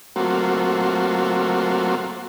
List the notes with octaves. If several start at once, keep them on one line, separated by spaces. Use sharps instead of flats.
F#3 A3 A#3 C4 F4 F#4